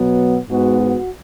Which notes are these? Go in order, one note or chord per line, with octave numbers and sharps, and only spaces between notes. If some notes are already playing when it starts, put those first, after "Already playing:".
Already playing: B2 F#3 B3
G#2 G#3 B3 F#4
F#4